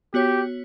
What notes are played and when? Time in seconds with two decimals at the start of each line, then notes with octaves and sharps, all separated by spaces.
0.14 B3 F#4 G4 C#5